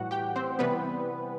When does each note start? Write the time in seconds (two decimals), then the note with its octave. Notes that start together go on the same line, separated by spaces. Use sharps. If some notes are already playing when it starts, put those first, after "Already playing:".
Already playing: A2 E3 G3 F#4 F#5
0.11 G4 G5
0.36 C4 C5
0.59 C3 E3 G3 B3 B4